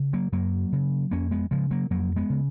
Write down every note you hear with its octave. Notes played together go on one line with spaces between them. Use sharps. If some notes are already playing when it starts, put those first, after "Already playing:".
Already playing: C#3
F#3 A#3
F#2 F#3 A#3
C#3
F2 A#3 C#4
G#3 B3
C#3 F3 G#3
F#3 A#3
F2 F#3 A#3
G#3 B3
C#3